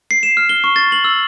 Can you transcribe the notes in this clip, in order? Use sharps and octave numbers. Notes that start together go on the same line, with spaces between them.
C7
E7
F6
G7
C#6
A6
F#7
E6